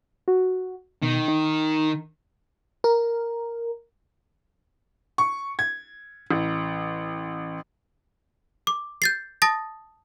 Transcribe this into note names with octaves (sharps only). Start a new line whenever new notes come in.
F#4
B2 D#3
D#4
A#4
C#6
G#6
A1
D6
G6 A6 C7
A5 D#6 A6 A#6